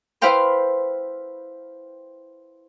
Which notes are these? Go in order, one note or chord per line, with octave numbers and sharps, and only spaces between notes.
E4 B4 C5 F5 G5 C6